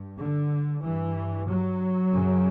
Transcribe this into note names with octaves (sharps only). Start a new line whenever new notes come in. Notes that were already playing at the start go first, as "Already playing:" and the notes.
Already playing: G2
D3
G2 E3
F#3
F#2 C#3